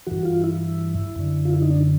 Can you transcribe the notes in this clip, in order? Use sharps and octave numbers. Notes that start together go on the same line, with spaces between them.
G2 E3 F#4
F4
E4
F#2 D3
F4
E4
D#4
D4